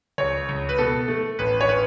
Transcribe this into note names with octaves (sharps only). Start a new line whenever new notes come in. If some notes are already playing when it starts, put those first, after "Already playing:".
C#2 C#5
C#2
B4
B2 A4
A3
A1 B4
C#5
C#4 B4